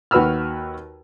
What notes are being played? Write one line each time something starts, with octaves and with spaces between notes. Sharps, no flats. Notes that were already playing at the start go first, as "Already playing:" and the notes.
D#2 F#4 B4 B5 E6 F6